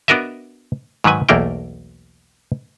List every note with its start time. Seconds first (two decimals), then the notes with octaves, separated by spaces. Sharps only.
0.08 B3 D4 F#4 A#4 D#5 E5
1.04 G#2 D#3 F#3 B4 G#5
1.29 B1 E2 A3 A#3 A#4 G5